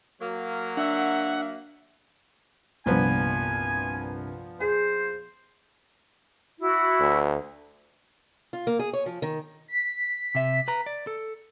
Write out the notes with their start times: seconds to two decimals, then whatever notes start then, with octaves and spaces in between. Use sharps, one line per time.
0.21 F#3 A#3
0.77 D4 E5 F#5 E6
2.86 C2 G2 A#2 F3 B3 G#5
4.60 G#4 C5
6.59 E4 F#4
7.01 D2
8.53 F4
8.67 A#3
8.79 G#4
8.93 C#5
9.06 F3
9.22 D#3
9.68 B6
10.35 C3 E5
10.68 B4 A#5
10.86 D5
11.07 A4